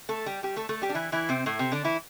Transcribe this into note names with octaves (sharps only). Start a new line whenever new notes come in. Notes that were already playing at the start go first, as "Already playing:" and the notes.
A3 A4
G3 G4
G3 G4
A3 A4
A3 A4
G3 G4
D4
E3 E4
E3 E4
C3 C4
A2 A3
C3 C4
D3 D4
E3 E4